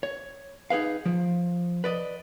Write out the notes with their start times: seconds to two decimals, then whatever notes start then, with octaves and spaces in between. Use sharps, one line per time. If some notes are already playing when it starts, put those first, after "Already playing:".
0.03 C#5
0.70 D#4 G#4 B4 F5
1.05 F3
1.84 B4 D5 D#5